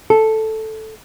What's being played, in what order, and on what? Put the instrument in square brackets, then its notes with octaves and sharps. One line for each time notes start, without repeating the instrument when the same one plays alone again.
[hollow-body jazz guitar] A4